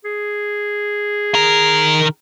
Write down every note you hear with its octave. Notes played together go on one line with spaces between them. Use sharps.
G#4
D#3 A#4